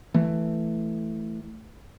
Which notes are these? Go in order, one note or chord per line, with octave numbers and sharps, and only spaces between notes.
E3 A3